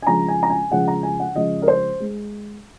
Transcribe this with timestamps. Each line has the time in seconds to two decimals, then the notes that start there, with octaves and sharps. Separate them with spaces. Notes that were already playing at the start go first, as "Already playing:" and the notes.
0.02 G#5
0.07 C#3 F3 G#3 A#5
0.28 G#5
0.43 A#5
0.50 G#5
0.71 C#3 F3 G#3 F#5
0.88 A#5
1.03 G#5
1.20 F#5
1.35 C#3 F3 G#3 D#5
1.62 A#4
1.68 C5
2.00 G#3